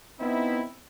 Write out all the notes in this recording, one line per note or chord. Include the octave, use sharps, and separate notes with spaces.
B3 C4 D#4 E4